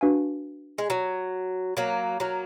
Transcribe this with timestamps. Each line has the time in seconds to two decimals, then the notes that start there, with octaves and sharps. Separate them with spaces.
0.01 D4 F#4 B4 F5 G#5
0.78 G#3
0.90 F#3
1.77 F#3 A#3
2.20 F#3 A#3